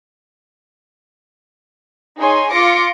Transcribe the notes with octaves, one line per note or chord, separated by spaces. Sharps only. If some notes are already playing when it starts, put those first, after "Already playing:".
D#4 G#4 C#5 G#5 C6
F4 C6 D6 A#6 C#7 D7